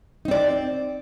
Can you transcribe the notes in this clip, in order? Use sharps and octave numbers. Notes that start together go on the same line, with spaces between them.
C4 D#4 D5